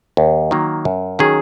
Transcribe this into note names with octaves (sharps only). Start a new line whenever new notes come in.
D#2
D#3 F#3 A#3
F#2
D#3 F#3 C#4 G#4